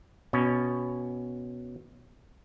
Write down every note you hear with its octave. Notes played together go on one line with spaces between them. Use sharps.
B2 C#4